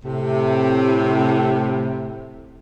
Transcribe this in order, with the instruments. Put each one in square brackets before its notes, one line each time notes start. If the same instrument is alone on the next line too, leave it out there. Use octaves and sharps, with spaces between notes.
[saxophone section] A2 C3